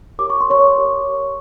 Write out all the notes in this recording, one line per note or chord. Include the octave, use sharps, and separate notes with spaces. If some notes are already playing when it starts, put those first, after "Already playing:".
G4 A#4 C#5 D6
C#6
C6
C#5 C#6
G4 A#4 C#5